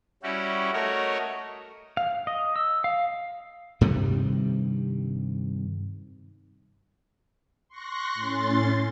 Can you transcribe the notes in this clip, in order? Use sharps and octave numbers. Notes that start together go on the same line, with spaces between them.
G3 C#4 E4 F#4 G4
A3 F#4 A#4 C#5 D#5
F5
D#5
E6
F5
G2 C3 D#3 G3
C6 C#6 F#6 A#6
A2 C#4 C6 A6